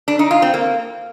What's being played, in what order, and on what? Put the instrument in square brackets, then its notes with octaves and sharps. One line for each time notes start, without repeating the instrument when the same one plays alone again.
[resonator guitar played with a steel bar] D4
D#4
F4
C4
A#3